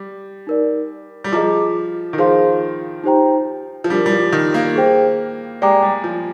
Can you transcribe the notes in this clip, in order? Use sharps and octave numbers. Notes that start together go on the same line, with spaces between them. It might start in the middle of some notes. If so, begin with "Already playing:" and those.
Already playing: G3
D#4 A#4 D5
G3
F3 G#4 D#5 A#5 D6
D#3
F3 G#4 C5 F5 C6
D#4 G4 C5 G5 A#5
F3
G3 D4 G4 A#4
G3
F3
D#3
A#3
G#4 C5 G5
G#3 G4 D5 G5 A#5 D6
G3
F3